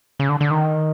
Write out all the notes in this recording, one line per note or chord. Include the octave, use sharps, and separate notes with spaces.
C#3
D3
D3
D#3